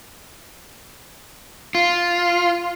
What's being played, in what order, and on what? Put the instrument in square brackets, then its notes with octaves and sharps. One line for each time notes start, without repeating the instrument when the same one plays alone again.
[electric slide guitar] F4